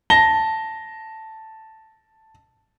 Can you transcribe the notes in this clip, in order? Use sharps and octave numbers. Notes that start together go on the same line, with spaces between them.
A5 A#6 G7